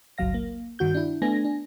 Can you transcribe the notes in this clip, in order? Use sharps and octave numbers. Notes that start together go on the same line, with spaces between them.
G1 C#2 F#3 F5 A#6
A#3
G2 D#3 F#4 G6
D4 E4
A3 B3 D4 G#5 A#6
D4